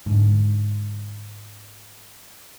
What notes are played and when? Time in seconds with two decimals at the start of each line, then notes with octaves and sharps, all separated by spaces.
0.06 G#2 D3